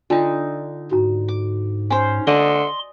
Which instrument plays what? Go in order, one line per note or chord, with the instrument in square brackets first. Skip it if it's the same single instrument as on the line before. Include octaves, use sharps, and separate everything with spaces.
[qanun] D3 D#4 [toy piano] D4 F4 A5
[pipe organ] G#2 [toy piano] F#4 A#5
[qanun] D6
[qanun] C#4 C5 [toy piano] G#5
[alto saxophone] D3 [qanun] D5 D#5 [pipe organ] C6